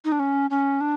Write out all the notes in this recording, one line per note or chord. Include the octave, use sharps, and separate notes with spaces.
D#4
D4
C#4
C#4
D4